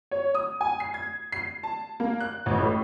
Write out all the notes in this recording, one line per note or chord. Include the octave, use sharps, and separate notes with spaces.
C#5
D#6
G#5
C7
G#6
C7
A5
A#3
F#6
A1
A2